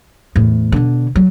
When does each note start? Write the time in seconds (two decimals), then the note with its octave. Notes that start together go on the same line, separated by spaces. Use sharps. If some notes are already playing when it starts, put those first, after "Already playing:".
0.36 E2 A2
0.72 B2 D3
1.16 F#3